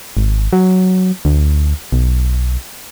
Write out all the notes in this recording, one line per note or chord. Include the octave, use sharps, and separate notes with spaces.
G#1
F#3
D2
B1